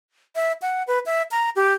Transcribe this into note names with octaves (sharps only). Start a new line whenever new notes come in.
E5
F#5
B4
E5
A#5
G4